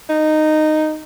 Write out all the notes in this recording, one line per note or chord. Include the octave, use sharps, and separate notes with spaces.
D#4